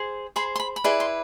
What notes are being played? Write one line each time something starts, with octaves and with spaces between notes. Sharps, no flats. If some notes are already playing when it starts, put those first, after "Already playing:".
Already playing: G#4 C5
G#4 C5 B5
C6
B5
B5
E4 G#4 B4 D5 C6
C6